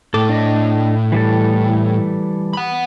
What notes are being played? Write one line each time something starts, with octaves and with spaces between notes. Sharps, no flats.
A2 A4 D6
D4 D#5
E3 G3 A4
F#5 B5